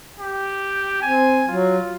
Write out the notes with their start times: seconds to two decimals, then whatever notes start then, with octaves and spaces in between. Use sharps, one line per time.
0.20 G4
1.02 C4 G#5
1.48 F#3 F4